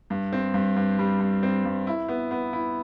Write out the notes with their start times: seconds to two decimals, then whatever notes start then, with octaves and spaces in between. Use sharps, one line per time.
0.10 G2
0.33 C4
0.54 G2
0.76 G2
0.99 G3
1.20 G3
1.43 C4
1.65 G2
1.87 E4
2.08 B3
2.31 B3
2.53 E4